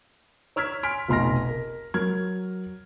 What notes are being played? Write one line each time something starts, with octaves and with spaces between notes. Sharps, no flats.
C#5 E6 F6 G#6 B6
G#5 C6 F6 B6 D7
F1 B1 C6 F6 A#6
A#4
F#3 A#4 F6 G#6